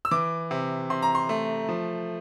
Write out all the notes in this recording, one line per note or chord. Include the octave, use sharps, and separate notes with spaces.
E6
E3 D6
C3
C3 C6
A#5
C6
A3
F3